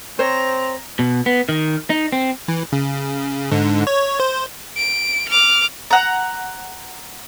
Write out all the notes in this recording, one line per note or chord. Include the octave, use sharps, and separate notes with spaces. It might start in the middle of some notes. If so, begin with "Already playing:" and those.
C4 C5 C#5 A#5
B2
B3
D#3
D#4
C4
E3
C#3
G#2 D3
C#5
C5
D7
D6 F6
F#5 A#5